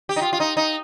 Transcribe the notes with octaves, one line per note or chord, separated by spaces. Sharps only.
G4
D#4
F4
F4
D#4
D#4